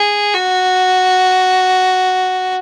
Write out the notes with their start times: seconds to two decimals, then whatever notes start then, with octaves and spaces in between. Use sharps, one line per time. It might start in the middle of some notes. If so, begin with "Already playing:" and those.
Already playing: G#4
0.34 F#4